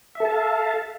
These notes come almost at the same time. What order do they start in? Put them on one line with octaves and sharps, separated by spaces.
E5 A4 A5 F5